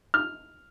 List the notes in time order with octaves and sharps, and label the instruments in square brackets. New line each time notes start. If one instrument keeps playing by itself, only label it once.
[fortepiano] F6